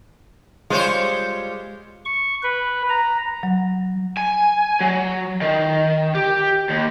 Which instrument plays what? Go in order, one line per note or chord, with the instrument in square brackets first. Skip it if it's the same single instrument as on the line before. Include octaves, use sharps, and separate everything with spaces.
[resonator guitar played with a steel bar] G3 G#3 [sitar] F4 C5 C#5
[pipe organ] C#6
B4
A#5
[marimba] F#3
[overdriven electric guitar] G#5
F#3
D#3
G4
D#2